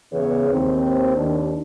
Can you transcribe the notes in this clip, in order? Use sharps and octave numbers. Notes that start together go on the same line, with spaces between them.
E2 C#3 E3 B3 G#4 C#5
D#2 C4
D#2 D4